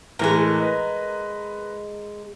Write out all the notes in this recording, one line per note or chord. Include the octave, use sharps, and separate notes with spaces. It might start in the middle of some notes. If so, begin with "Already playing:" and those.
A2 E3 G#3 A3 A#4
B4 D#5